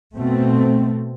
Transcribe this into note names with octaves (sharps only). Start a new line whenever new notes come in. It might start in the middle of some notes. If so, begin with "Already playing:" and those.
B2 A3 C4